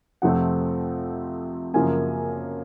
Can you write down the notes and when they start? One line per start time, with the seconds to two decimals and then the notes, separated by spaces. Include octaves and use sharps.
0.22 F2 C3 F3 A3 C4 F#5
1.74 F#2 C#3 F3 A#3 C#4 G#5